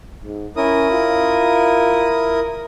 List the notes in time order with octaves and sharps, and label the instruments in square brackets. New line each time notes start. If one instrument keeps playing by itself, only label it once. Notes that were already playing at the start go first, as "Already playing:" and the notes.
[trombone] G#2
[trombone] C#4 [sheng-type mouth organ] E4 A#4 D#6
[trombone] F4